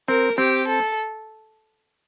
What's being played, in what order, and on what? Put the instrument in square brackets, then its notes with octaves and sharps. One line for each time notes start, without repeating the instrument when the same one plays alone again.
[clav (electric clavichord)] C4 [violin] A#4
[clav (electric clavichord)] C4 [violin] G4
[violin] A4